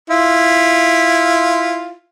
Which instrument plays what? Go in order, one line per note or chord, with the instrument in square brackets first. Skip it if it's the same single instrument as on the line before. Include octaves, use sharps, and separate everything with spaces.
[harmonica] E4 F4